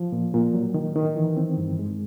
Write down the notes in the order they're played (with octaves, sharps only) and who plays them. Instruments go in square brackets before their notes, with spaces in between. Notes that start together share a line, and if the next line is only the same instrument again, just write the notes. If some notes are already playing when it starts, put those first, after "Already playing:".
Already playing: [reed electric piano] F3
A#2
A#2
F#3
D#3
D#3
E3
C4
G2
G#3